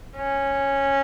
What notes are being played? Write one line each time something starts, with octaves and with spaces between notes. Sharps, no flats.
C#4